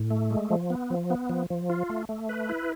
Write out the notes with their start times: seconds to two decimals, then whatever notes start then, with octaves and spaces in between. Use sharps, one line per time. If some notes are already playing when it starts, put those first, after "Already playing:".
Already playing: A2
0.10 A3
0.31 G#3
0.50 F3
0.70 B3
0.90 F3
1.10 B3
1.30 F3
1.50 F3
1.70 F4
1.90 A3
2.09 A3
2.29 B4
2.49 E4